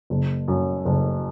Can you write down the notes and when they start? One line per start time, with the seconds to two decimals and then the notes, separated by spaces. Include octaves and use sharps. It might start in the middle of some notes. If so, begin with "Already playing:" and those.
0.10 F#1
0.48 F#2
0.85 F#1